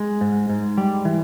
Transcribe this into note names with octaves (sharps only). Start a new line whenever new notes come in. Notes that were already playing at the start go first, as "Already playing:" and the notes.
Already playing: G#3
G#2
G#2
G3
E3